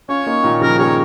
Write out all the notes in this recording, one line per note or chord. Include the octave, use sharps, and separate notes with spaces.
C#4 F4 C#5
A#3 D#4
A#2 D#3
C#3 F3 A#4
D#3 G#3 C#5